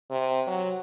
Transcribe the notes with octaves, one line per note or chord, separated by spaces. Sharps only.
C3
F#3